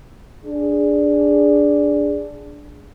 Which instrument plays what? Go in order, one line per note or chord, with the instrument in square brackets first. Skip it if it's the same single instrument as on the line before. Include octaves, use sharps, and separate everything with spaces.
[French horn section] D4 G#4